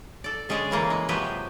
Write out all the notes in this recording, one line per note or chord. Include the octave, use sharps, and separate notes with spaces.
A4 D5
D3 G#3 C#4 G#4 D5
C#3 E3 A#3 A4
G#3
C3 F3 F#3 G4 G#4 B4